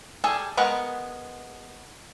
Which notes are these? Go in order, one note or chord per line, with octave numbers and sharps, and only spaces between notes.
G3 G#4 A4 G#5
G#3 B3 A#4 B4 F#5